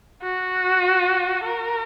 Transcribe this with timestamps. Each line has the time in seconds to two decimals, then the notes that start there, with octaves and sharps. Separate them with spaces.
0.23 F#4
1.44 A#4